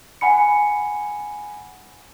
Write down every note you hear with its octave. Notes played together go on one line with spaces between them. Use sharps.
F#5 G#5 B5 C#7